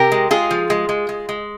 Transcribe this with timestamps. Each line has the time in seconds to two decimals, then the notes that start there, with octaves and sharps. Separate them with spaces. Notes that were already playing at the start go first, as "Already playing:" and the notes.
Already playing: C3 G4 A#4
0.12 G#3
0.31 G#3 F4 G#4
0.51 F3
0.70 G#3
0.89 G#3
1.09 G#3
1.29 G#3